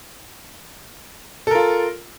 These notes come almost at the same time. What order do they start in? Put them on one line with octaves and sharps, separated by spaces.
A4 A#4 F4